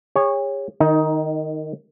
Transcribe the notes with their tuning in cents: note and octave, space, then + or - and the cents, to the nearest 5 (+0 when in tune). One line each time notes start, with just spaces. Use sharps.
G#4 -45 C#5 -5
D#3 -15 D#4 +15